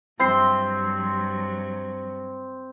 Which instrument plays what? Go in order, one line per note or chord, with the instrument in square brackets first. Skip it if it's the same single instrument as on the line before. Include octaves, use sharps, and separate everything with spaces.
[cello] G2 F#3 [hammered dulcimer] C4 C6